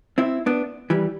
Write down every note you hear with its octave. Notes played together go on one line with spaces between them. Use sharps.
C4 E4
B3 D4
E3 G3